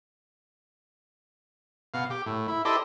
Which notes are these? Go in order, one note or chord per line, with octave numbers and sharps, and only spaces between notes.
B2 F5
G4
A2
E4
E4 G4 A4 C5 D5 D#5